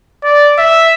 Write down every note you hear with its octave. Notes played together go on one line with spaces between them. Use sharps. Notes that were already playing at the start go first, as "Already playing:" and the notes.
D5
E5